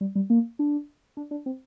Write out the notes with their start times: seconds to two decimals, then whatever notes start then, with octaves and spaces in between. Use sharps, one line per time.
0.01 G3
0.15 G3
0.30 A#3
0.59 D4
1.17 D4
1.31 D4
1.46 C4